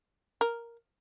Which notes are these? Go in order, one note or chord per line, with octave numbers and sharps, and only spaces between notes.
A#4